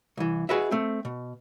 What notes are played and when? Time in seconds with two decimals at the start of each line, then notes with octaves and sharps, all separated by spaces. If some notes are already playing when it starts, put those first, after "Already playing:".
0.17 C2 E3
0.49 F#4 G#4 B4 D#5 E5
0.71 A3 C4
1.05 B2